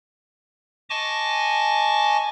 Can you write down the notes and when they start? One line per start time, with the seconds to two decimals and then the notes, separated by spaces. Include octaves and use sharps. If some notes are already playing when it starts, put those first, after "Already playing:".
0.90 D#5 G#5 A5 C#6 D6